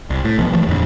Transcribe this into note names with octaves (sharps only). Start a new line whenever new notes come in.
C2
A2
B1 B2 F3 B3
G1 E3 F3 A3
D#1 F2 A#2 D3